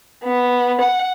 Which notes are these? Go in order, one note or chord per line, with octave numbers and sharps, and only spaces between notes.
B3
F#5